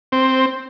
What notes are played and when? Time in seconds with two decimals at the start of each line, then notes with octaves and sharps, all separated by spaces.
0.12 C4